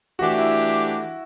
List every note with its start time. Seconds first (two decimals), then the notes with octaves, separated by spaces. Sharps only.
0.19 E3 A3 D4 F#4 G4
0.38 E4